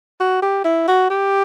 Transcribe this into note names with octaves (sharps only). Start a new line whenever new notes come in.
F#4
G4
E4
F#4
G4